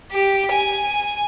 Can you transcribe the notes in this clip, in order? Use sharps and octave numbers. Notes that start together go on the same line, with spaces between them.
G4
G#5